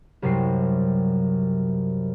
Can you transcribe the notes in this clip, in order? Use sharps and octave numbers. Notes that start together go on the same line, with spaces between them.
C2 F#2 C3 F#3 C7